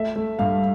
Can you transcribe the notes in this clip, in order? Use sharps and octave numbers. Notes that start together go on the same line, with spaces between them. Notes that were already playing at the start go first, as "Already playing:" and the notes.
Already playing: A3 E5
A3
G2 F5